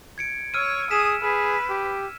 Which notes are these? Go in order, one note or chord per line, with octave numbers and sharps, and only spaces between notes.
G#6 C#7 D7
C#5 E6 F6 D#7
G#4 D#6 B6 E7
G#4 B4 F6
G4